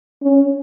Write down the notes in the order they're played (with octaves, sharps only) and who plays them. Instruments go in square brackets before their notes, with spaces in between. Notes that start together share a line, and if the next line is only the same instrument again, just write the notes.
[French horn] C#4